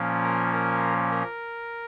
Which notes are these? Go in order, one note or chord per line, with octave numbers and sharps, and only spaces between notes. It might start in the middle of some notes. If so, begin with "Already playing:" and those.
Already playing: A#2 F3 A#3 C#4
A#4
A#4
A#4